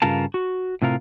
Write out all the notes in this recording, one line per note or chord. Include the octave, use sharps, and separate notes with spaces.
G2 C#3 F4 A#4 A5
F#4
A2 C3 F4 A#4